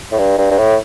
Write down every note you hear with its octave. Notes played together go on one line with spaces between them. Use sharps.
A2
G2
G2
G2
A2